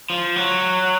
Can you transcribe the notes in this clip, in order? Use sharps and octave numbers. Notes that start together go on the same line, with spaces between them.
F3
F#3